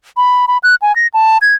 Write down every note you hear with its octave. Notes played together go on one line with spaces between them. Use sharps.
B5
B5
F#6
G#5
A#6
A5
G#6